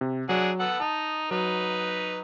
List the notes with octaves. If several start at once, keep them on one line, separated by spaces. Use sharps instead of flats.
C3
F#3 D4 G#4 F#5
B3 A4 F#5
D#4 A5
F#3 D#4 B4